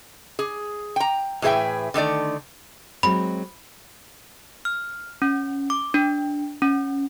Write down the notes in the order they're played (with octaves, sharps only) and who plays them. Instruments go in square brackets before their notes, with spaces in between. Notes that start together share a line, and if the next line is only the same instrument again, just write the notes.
[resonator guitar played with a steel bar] G#4
G5 A#5
A2 E3 G#4 B4 E5 G5
D3 D#3 A3 D5
[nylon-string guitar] F#3 G#3 C4 [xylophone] B5
[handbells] F6
C#4
D6
D4
C#4